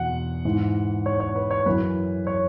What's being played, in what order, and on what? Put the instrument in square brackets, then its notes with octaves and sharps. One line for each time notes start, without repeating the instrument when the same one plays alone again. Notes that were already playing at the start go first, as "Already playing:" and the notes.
Already playing: [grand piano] E2 B2 F#5
G#2 E3
C#5
C#5
B4
C#5
F#2 E3 B4
C#5